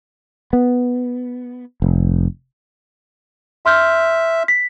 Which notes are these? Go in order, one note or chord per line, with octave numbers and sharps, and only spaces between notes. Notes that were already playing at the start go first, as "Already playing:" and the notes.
B3
F1
E5 C6 F6 G6
B6